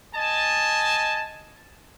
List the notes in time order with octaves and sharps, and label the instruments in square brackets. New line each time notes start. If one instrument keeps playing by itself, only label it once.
[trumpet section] D#5 G#5 A5